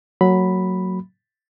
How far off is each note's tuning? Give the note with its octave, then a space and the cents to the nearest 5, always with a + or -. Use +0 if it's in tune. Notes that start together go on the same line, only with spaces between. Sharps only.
F#3 +0 A#3 -35 B5 +0